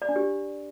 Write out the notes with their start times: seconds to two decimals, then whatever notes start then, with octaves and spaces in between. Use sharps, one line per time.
0.02 D5
0.09 D4
0.16 G4